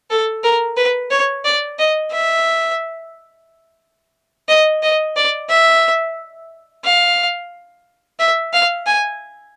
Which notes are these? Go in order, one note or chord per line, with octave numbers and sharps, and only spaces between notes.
A4
A#4
B4
C#5
D5
D#5
E5
D#5
D#5
D5
E5
F5
E5
F5
G#5